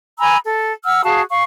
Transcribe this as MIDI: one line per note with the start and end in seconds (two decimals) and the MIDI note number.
0.19 0.36 80
0.19 0.36 82
0.19 0.36 83
0.19 0.36 88
0.43 0.73 69
0.85 1.02 78
0.85 1.02 88
0.85 1.02 89
1.05 1.22 66
1.05 1.22 68
1.05 1.22 77
1.05 1.22 81
1.30 1.43 77
1.30 1.43 85